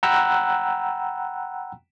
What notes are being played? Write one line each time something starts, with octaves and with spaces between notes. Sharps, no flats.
F#5 G5 A#5 B5 E6 F#6